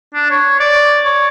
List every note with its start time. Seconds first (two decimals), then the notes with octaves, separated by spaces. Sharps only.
0.14 D4
0.30 C#5
0.60 D5
1.05 C#5